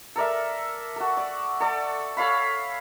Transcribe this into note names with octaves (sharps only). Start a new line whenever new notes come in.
A4 A#4 D5 E5
F#4 A4
D5
A4 D5
A4 C#5 F5 B5